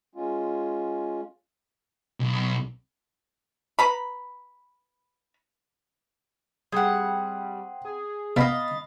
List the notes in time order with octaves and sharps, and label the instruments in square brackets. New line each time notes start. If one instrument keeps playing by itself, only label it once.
[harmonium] G#3 C#4 F4
[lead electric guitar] B1
[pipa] B4 A#5 B5
[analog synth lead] G3 [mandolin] C4 F#5 [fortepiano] G#4
[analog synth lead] G#4
[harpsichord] B2 [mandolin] D#5 A#5 B5 [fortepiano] F5 [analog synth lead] A6